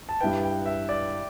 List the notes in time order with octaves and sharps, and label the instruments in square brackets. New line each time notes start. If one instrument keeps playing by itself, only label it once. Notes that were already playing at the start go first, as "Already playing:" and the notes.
[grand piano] A5
[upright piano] G2 G3 E4 B4 [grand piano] G5
[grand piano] G5
E5
D5